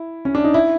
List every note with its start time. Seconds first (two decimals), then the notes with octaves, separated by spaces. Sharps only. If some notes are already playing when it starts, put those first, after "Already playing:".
Already playing: E4
0.25 C#4
0.35 D4
0.44 D#4
0.54 E4